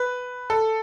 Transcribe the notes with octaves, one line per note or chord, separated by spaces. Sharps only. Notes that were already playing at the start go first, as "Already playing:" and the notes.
Already playing: B4
A4